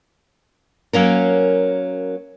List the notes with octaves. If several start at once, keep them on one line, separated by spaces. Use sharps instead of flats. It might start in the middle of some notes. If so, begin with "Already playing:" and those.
F#3 A#3 C#4 A#4